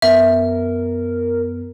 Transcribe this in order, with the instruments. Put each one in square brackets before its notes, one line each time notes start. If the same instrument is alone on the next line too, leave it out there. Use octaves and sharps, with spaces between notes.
[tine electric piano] F#2 B3 [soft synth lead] A#4 [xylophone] E5